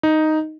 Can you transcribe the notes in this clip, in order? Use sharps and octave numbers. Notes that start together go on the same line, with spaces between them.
D#4